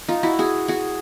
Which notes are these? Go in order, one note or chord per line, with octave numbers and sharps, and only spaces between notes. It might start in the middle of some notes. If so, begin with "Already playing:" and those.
D#4 F4
E4 F#4
F#4 G#4
F#4 G#4